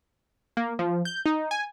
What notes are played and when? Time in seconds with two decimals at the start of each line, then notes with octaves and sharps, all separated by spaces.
0.57 A#3
0.79 F3
1.05 G6
1.26 D#4
1.51 G#5